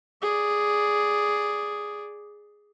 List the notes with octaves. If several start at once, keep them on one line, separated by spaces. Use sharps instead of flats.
G#4 D5